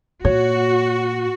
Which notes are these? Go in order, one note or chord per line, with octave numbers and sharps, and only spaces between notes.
A#2 F#4 C#5